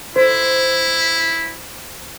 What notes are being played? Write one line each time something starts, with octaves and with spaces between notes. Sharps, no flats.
E4 C5